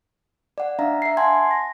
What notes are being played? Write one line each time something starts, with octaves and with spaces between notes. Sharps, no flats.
D5 F#5
D4 E5 F5 A#5
E5 C7
F#5 G#5 A5 C6 G#6
A#6